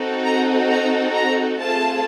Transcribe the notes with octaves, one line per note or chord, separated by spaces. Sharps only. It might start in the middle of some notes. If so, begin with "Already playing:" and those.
Already playing: C4 D#4 F#4 A4
A#5
A#5
A#5
A3 C4 F4 G#4 A5